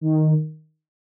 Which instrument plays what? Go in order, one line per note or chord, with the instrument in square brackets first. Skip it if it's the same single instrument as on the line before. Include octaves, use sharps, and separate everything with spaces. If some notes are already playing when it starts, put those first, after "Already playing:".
[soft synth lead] D#3